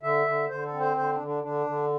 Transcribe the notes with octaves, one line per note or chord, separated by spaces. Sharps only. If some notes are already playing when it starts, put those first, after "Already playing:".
D3 E5
D3
D3 C5
A4
C4
C5
D3 C5
D4
D3
D4
D3 D4
D3